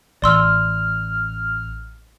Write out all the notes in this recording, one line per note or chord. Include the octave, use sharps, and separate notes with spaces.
A1 D5 C6 E6 F6